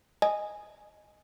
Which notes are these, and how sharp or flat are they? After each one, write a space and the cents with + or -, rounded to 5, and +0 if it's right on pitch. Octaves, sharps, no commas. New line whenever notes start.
D#5 -5 G#5 +0